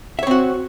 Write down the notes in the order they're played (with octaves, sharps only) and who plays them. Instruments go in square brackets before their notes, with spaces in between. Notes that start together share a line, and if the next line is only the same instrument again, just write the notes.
[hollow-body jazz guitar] E5
C#5
C4
F#4